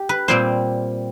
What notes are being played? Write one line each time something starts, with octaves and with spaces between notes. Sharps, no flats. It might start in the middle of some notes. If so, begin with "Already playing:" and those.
Already playing: G4
B4
A#2 G3 C4 C5